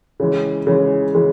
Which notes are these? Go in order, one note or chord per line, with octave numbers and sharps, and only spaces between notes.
C#3 E3 G#3
C#3 E3 G#3
C#3 E3 G#3